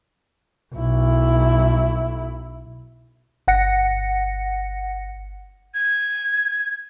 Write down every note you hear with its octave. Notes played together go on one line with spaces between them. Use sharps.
B1 E4
G1 F#5 A#6 C#7
G#6